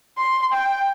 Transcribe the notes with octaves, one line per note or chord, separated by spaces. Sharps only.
C6
G5